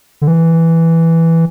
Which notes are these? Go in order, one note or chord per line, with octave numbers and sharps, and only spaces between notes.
D3
E3